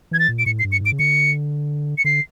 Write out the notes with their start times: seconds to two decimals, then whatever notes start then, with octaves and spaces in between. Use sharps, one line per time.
0.11 E3 G#6
0.19 A6
0.28 A#2
0.39 D7
0.46 A2 C#7
0.59 C7
0.64 G2
0.72 C#7
0.81 G#2 D7
0.92 C#3
0.99 D3 C#7
1.98 C#7
2.04 D3 C7